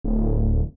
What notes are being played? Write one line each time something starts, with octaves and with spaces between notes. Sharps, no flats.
D1